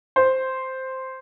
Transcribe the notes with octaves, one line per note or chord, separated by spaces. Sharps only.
C5